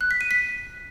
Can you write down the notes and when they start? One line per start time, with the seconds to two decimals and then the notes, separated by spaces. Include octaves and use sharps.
0.01 F#6
0.11 B6
0.21 D#7
0.31 B6